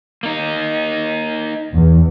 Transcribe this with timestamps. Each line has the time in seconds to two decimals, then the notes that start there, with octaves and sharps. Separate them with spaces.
0.23 A#3 D#4
1.73 E2